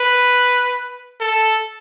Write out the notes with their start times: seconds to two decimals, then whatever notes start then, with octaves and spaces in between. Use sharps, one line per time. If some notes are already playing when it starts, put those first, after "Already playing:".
Already playing: B4
1.20 A4